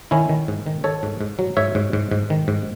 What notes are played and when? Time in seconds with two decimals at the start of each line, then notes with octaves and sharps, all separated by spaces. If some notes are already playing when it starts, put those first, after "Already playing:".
0.11 D#3 C#4 E4
0.29 D#3
0.48 G#2
0.66 D#3
0.84 D#3 A4 C#5
1.03 G#2
1.21 G#2
1.39 F#3
1.57 G#2 C#5 E5
1.75 G#2
1.93 G#2
2.11 G#2
2.30 D#3
2.48 G#2